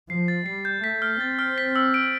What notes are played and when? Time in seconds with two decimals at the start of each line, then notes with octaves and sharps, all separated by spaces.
0.10 F3 C7
0.28 A6
0.46 G3 C7
0.65 G6
0.83 A3 B6
1.02 F6
1.20 C4 A6
1.39 F6
1.58 B6
1.76 E6
1.94 D7